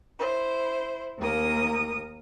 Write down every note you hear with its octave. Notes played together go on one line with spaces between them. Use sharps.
E4 C5
D#2 A#3 A#4 D#6